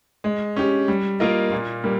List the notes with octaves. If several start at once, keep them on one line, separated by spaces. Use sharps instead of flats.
G#3
C#4 G4
G3
A#3 F4 A#4 D#5
A#2
G3 A#3